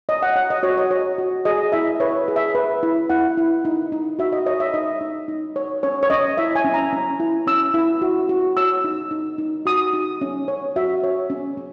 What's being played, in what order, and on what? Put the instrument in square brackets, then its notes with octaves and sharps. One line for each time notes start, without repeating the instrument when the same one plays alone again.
[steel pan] C#5 D#5
F#5
C#5 F#5
D#5
F#4 C#5
D#5
C#5
F#4
G#4 D#5
E4 E5
B4 C#5
G#4
E5
B4
E4
E4 F#5
E4
D#4
D#4
F#4 E5
D#5
C#5 D#5
E5
D#4 D#5
D#4
D#4
C#5
C#4 C#5
C#5
C#4 D#5
E4 E5
G#5
C#4
A#5
C#4
E4
C#4 E6
E4
F#4
F#4
C#5 E6
D#4
D#4
D#4
F#4 D#6
D#4
C#4
C#5
F#4 E5
C#5
C#4
C#4